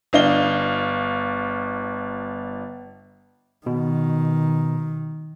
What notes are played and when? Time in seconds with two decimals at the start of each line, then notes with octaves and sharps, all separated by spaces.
0.13 G1 D4 D#5 F5 G7
3.66 B2 D#3